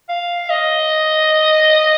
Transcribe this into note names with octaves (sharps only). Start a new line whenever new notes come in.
F5
D#5